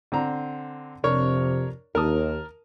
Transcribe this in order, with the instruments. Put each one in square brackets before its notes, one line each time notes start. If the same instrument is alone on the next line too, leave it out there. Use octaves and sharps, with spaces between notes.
[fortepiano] D3 C4 A#5
[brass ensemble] F2 C3 [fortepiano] D4 A#4 C#5
[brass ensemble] D#2 [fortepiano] A#4 A5 D#6